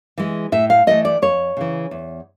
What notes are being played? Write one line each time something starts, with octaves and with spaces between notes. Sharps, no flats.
E3 G#3
A2 E5
F5
E3 A3 C#4 E4 D#5
D5
F2 C#5
C#3 E3
E2